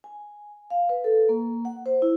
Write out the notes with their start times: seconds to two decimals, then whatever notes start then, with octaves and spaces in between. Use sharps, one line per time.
0.04 G#5
0.70 F5
0.89 B4
1.04 A4
1.29 A#3
1.65 F#5
1.86 C5
2.02 E4